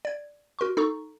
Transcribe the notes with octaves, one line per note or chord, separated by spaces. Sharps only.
D5 G#6
F#4 A#4 C6 C#6
D#4 A4 A#5 C#6